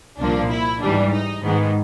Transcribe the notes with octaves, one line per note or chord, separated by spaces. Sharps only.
C2 A#2 F3 A#3 D4
E4
G#2 E3 G3 D4
D#4
G#2 D#3 G#3 B3